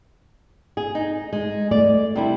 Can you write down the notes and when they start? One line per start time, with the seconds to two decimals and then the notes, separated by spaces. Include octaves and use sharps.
0.77 G#4
0.95 D#4
1.33 G#3
1.71 A3 D5
2.16 C3 G3 E4